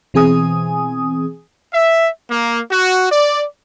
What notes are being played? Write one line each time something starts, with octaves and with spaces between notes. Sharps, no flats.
B2 E3 C4 G#4 G#5 D#6
E5
A#3
F#4
D5